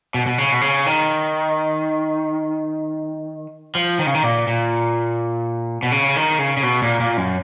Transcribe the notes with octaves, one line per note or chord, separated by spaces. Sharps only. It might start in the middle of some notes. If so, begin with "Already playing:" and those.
B2
B2
C#3
B2
C#3
D#3
F3
D#3
C#3
D#3
A#2
A#2
B2
C#3
D#3
C#3
C#3
B2
A#2
A#2
F#2